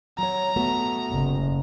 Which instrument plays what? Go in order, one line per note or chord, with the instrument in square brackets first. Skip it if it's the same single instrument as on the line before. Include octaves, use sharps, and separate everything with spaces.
[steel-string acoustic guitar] F#3 C#5 [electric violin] A#5
[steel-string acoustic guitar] A3 B3 F#4
[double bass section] F#1